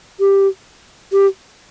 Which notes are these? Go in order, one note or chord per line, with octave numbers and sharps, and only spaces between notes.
G4
G4